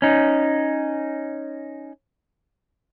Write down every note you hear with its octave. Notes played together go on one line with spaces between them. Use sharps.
C#4 D#4